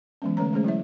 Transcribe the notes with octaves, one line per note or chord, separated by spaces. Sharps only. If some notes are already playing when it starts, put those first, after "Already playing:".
E3 F#3 G#3 B3 C#4
D3 A3 C#4 B4 C#5 A#5
G#3 A3 C#4 G#4 C5
F#3 E4 C#5 E5